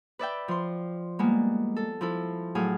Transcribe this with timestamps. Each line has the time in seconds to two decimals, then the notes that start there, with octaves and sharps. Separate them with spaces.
0.19 B4 D5 E5 G5
0.48 F3 C6
1.19 G3 G#3 A#3 B3
1.76 A4
2.01 F3 E4 A4
2.55 A2 F#3 G#4 F5